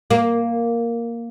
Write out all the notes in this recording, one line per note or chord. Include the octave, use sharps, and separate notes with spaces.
A#3